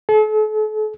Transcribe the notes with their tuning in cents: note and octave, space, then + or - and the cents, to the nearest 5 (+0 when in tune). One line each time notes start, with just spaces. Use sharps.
A4 -40